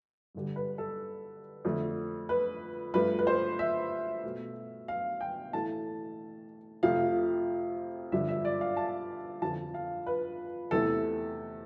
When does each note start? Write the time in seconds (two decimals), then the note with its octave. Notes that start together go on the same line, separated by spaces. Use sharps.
0.35 G2 D3 G3
0.56 B4
0.78 A4
1.64 F2 D3 A3
2.29 B4
2.94 G2 F3 A3 B4
3.19 B4
3.27 C5
3.59 E5
4.24 B2 A3
4.88 F5
5.21 G5
5.53 A2 E3 A3 A5
6.83 F2 C3 F3 A3 F5
8.12 G2 D3 F3 E5
8.28 E5
8.45 D5
8.61 F5
8.77 A5
9.42 F2 D3 F3 A5
9.74 F5
10.07 B4
10.71 E2 C3 E3 A3 A4